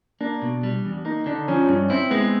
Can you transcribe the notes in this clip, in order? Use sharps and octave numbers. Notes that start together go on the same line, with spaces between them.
A#3 D4
B2
G3
E2
A#3 D#4
D3 D4
F3 C#4
G2 C#4
C4 E4
G#3 B3